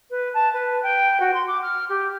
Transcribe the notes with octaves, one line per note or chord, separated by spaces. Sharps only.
B4
A5
B4
G5
F#4
C6
D6
F6
G4